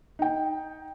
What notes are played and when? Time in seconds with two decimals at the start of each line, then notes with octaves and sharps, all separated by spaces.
0.19 D#4 G5